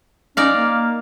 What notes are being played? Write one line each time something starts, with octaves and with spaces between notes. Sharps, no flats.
C#4 D#4 D5 F5
A#3